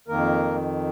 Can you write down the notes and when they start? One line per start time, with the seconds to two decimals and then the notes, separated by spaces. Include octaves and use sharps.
0.08 F2 D#3 A#3 A#4